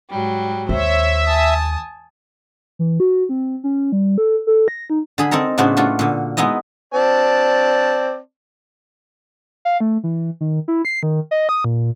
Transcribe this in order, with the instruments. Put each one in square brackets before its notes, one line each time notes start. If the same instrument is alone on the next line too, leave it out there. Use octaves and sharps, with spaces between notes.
[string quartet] G#2 F#3 G3
[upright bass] D#2 [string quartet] C5 C#5 [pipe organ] E5
[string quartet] G#5 A5 D#6
[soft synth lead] E3
F#4
C4
C#4
G3
A4
A4
A#6
D#4
[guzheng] D3 G#4 B5
C4 D#4 A4 A#4
A2 C#3 B3 D4 F#4 C5
A3 D4 F4 F#4
A#2 D3
G#3 B3 D#4 E4 D#5
[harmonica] C4 D5 A5
[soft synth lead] F5
A3
E3
D#3
E4
C7
D#3
D#5
D#6
A#2